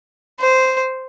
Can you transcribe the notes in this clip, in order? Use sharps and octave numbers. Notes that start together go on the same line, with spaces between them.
C5